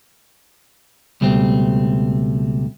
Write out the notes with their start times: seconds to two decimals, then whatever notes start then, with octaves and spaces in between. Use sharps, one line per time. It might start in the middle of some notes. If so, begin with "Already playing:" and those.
1.21 C#2 B2 G3 A3 C4